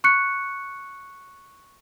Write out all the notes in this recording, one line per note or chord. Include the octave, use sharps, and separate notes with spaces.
C#6 F#6 C#7